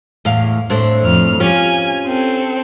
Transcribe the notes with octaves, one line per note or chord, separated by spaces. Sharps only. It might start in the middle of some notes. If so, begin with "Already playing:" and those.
E2 A2 F5
A2 C4 D4
F2 F6
C#4 F4 G4 G#5
C4 A4